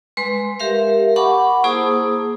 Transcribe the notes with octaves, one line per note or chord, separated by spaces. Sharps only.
G#3 B4 C6
G4 A#4 E5 F5
F#5 A5 B5 C#6 D6
A#3 E4 G#4 C5 A5 D#6